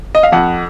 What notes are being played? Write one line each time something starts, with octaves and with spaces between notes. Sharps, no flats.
D#5
F5
F2 F#5